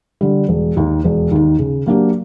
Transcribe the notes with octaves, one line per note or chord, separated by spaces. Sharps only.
D3 G3
E1
D#2 D#3
E1
D#2 D#3
C#3
F#3 A#3 D4 G4